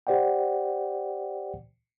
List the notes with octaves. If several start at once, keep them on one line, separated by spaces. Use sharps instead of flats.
G4 C5 D5 F#5 G5